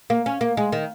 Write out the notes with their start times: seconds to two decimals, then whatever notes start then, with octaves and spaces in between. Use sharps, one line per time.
0.10 A#3
0.26 C#4
0.41 A#3
0.57 G#3
0.72 D#3